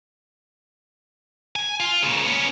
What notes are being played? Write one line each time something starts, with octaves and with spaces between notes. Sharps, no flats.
G#5
F4
A#2 C#3
B3 C#4